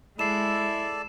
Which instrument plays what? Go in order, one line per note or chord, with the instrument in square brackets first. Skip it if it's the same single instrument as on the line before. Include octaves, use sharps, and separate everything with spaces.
[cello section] G#3 [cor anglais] E4 [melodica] A4 D5 [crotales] C7 E7